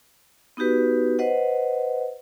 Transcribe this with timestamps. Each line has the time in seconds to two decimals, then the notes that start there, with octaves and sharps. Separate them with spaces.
0.57 B3 D#4 F#4 G4 B4
1.19 B4 C5 D#5 F#5